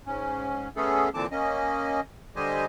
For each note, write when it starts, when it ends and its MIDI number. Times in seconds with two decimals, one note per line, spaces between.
0.06 0.68 44
0.06 0.68 61
0.76 1.09 57
0.76 1.09 59
0.76 1.09 61
0.76 1.09 68
0.76 1.09 69
1.14 1.26 46
1.14 1.26 50
1.14 1.26 52
1.14 1.26 60
1.14 1.26 81
1.14 1.26 86
1.32 2.00 58
1.32 2.00 61
1.32 2.00 75
2.36 2.65 50
2.36 2.65 55
2.36 2.65 67
2.36 2.65 72
2.36 2.65 75
2.36 2.65 80